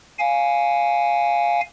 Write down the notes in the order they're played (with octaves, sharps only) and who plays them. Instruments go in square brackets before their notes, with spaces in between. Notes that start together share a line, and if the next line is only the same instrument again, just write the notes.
[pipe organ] F5 G#5